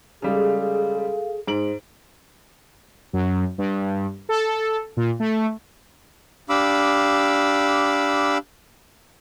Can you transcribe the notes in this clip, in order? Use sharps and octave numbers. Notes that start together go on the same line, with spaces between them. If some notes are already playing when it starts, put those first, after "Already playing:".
C#3 G3 G#3 G#4 A4 F5
G#2 C5 D7 F#7
F#2
G2
A4
A#2
A3
D4 G4 F5 B5 D6 E6